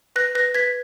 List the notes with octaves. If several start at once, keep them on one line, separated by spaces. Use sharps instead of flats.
B4 F#6 A#6
B4 F#6 A#6
B4 G#6 B6